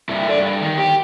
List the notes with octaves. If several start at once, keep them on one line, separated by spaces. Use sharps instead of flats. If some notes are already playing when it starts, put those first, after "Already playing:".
G2 E4
A4 D5
G2
D#3
G4